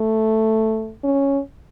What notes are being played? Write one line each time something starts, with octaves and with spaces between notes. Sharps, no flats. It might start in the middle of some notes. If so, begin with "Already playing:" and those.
Already playing: A3
C#4